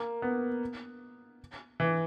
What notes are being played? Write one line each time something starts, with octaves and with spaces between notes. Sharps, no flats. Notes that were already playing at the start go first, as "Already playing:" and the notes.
Already playing: A#3
B3
E3